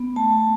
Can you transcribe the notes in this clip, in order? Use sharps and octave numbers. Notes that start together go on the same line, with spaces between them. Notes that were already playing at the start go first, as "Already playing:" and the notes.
Already playing: B3
A3 A5